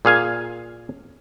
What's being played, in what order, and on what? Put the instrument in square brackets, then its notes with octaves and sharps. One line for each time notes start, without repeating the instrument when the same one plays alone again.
[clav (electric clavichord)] A#2 G#4 F5 G#5